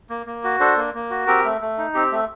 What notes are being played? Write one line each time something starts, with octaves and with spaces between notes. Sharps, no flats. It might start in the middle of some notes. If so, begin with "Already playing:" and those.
A#3
A#3
F#4
D4 A4 C5
A#3
A#3
F#4
C4 G4 A#4
A3
A3
D#4
C4 G4
A3